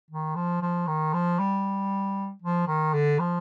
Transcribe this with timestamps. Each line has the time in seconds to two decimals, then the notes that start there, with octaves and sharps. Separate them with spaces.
0.11 D#3
0.36 F3
0.62 F3
0.87 D#3
1.14 F3
1.39 G3
2.42 F3
2.67 D#3
2.94 D3
3.19 F3